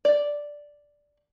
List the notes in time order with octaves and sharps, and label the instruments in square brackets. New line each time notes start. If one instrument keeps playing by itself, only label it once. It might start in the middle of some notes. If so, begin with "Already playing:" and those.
[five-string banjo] D5